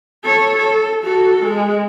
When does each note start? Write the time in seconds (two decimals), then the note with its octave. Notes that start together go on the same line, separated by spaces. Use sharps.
0.24 A4 C#5
0.58 A4
1.04 F#4 A4
1.43 G#3